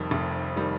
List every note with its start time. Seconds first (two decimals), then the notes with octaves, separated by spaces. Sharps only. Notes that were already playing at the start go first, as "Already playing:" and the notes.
Already playing: F1 F2 D#3 G3
0.11 F1
0.57 D#3 G3